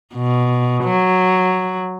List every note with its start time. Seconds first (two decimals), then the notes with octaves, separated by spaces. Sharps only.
0.15 B2
0.84 F#3